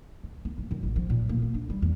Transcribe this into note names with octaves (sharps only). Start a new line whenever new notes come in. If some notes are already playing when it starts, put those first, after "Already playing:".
D#3
B3
D1
F#2
A1
F3
A#2
A#3
A#3
D4
G3
E2